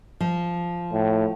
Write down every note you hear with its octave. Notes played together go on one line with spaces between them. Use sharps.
F3
A2